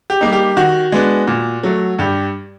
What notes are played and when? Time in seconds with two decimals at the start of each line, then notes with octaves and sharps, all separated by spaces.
0.10 G4
0.21 G3 A#3 D#4
0.33 G4
0.57 D#3 F#4
0.92 G#3 B3 D4
1.27 A#2
1.63 F#3 A3
1.99 G2 G4